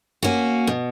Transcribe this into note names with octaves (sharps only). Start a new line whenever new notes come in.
A#3 C#4 F#4
B2